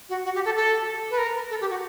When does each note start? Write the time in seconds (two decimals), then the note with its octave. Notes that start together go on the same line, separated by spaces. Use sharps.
0.09 F#4
0.25 F#4
0.35 G4
0.45 A4
0.56 A4
1.11 B4
1.18 A#4
1.50 A4
1.61 G4
1.70 F#4